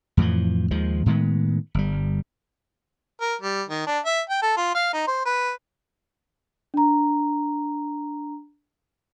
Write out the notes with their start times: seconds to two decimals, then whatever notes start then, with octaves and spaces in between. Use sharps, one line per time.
0.17 F2 A2 E3 F3
0.71 D#2 D#3 F3 G#3
1.06 A2 D#3 G#3 B3
1.74 G1 G3
3.21 A#4
3.41 G3
3.69 D#3
3.87 D4
4.06 E5
4.30 G5
4.42 A4
4.57 F4
4.75 F5
4.93 D#4
5.07 C5
5.25 B4
6.74 D4 A#5